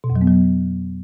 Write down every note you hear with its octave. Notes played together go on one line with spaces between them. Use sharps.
B2
F2
F#3
B3
F#3